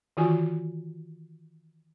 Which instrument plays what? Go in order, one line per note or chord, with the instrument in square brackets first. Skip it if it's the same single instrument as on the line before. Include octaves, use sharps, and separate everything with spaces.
[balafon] D#3 E3 F4 F#4 G#5 C#6